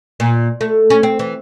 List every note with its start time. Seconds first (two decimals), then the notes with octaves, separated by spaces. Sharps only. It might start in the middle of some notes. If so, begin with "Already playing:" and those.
0.20 A#2
0.61 A3
0.90 C#4
1.03 C4
1.19 E3